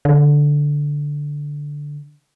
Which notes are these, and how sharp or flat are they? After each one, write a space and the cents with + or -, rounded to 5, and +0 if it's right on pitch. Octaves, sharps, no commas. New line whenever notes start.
D3 -5